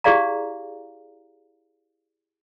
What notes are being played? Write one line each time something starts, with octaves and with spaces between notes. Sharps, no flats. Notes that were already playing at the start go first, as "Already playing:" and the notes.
E4 G4 G#4 D5 F5 A#5